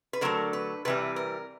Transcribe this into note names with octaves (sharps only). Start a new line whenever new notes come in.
B4
D3 F#3 A3 A#4
B4
C3 E3 G3 B4
A#4